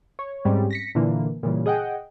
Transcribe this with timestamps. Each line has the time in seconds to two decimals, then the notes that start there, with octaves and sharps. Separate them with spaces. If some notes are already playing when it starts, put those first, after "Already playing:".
0.19 C#5
0.45 G#2 G3 C4 C#4
0.71 A#6 B6 C#7
0.95 A#2 D3 E3 A#3
1.43 A#2 C#3 E3 G3
1.66 G#4 D#5 F#5 G5